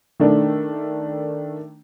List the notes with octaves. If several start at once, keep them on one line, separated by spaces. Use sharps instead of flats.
D#3 A3 D4